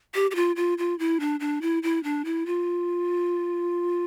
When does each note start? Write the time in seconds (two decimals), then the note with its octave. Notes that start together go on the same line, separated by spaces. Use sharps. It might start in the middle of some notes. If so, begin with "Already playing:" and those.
0.15 G4
0.31 G4
0.35 F4
0.56 F4
0.78 F4
0.99 E4
1.20 D4
1.40 D4
1.62 E4
1.83 E4
2.04 D4
2.25 E4
2.46 F4